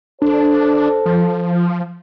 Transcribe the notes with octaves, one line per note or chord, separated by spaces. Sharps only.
D4 A4 C5
F3